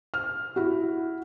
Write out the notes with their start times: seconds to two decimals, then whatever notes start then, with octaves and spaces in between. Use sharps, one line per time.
0.14 F6
0.56 E4 F#4